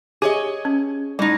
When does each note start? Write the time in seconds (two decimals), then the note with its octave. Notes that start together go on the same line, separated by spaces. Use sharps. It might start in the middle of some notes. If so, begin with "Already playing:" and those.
0.22 G4 G#4 C#5 D#5
0.65 C#4
1.19 A2 G3 D#4